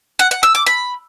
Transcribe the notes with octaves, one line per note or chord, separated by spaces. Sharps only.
F#5
F#5
E6
D6
B5